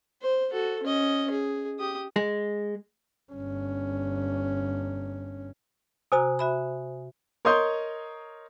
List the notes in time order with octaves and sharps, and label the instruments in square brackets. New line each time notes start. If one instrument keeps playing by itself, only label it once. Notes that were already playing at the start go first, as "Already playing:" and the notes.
[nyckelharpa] C5
F#4 A4
C#4 D#5
G#4
G4 D#6
[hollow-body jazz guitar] G#3
[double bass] G1 C#4
[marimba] C3 F#4 A#5 [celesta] C5 G#5 D#6
[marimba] F#4 E5 B5
[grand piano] A#4 C#5 D#5 C6 D#6 G6